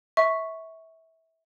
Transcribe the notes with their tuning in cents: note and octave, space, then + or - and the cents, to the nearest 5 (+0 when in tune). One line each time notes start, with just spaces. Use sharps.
E5 -25 C#6 +0